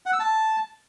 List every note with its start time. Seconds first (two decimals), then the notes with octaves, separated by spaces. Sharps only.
0.06 F#5
0.13 E6
0.20 A5